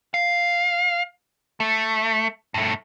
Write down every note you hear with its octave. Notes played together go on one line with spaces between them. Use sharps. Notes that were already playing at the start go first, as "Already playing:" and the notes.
F5
A3
G2 A3